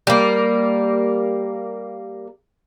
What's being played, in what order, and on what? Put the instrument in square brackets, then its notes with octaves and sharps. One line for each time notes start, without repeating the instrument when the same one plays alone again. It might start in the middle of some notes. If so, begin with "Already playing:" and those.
[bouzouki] G3 A#3